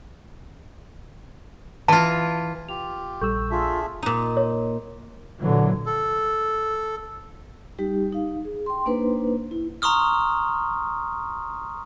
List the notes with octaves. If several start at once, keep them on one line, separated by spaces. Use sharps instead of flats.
E3 F4 A5
F4 G4 F7
A#1 G3 A4 C#6 E6 G6
D4 F4 G#4 E5
A#2 D#4
C#5
A#2 D3 E3 F#3
A4
G3 D#4 G4
D#4 F5
G#4
G5 C6
A#3 D4 D#4 B4 C5
E4
A#5 C6 C#6 D#6 F6